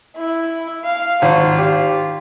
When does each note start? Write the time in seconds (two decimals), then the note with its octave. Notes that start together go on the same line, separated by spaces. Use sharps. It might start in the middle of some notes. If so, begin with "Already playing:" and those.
0.16 E4
0.84 F5
1.22 G#1 F4
1.58 G4